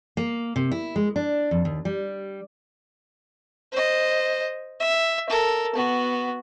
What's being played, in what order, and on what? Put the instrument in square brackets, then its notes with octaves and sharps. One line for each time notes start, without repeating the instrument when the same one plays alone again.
[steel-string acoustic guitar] A#3
C3
E4
G#3
D4
F2
D#2
G3
[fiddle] C5 D#5
E5
A4 A#4
B3 F#4